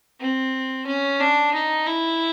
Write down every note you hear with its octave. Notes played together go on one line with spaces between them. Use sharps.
C4
C#4
D4
D#4
E4